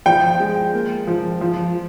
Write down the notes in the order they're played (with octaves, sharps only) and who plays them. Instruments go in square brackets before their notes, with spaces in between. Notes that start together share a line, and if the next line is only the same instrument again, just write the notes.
[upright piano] F3 G5
G#3
A#3
F3
F3